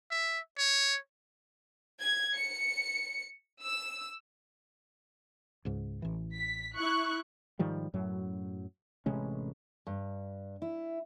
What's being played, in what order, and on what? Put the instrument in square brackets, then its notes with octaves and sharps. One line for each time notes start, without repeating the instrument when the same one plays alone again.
[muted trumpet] E5
C#5
[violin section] G#6
C#7
E6
[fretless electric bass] C#2 G#2
A1 E3
[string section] B6
E4 C#6 F#6
[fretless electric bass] G#2 D#3 F3 G3
F#2 A2 F#3
A1 C3 G#3 C#4
[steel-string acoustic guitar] G2
E4